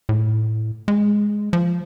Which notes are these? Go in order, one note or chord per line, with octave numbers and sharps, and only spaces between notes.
A2
G#3
F3